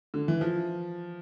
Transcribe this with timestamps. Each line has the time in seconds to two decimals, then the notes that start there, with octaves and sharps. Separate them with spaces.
0.14 D3
0.28 E3
0.41 F3